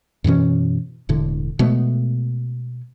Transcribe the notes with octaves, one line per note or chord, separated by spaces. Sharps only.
F#2 B2 E3 C#4
E1 A2 D3
B2 G#3 A3 B3